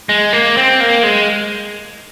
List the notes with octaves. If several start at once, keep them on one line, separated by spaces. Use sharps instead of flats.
G#3
A#3
C4
A#3
G#3